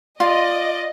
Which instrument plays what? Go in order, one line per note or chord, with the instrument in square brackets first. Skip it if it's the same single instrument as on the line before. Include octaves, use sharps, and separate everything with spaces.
[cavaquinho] F4 [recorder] D5 [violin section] D#5